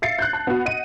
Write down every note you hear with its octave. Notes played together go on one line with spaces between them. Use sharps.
E5 F5 A6 C7 C#7
F#6 G6
A5
B3 F#4
D#5 F#5 D#7